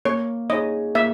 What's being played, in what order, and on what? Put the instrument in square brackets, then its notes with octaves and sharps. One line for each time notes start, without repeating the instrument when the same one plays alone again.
[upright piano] A#3 [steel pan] C#5
[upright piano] D#4 G#4 C#5 [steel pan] D#5
[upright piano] A#3 [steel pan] E5